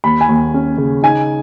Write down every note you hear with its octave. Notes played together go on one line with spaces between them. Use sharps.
D#2 B5
G#5
D#2
C#4
C#3
D#4 G#5